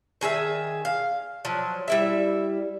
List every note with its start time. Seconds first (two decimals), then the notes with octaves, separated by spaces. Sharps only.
0.21 D#3 G#4 A4 E5
0.85 F5
1.45 F3 F#3
1.88 G3 E4 E5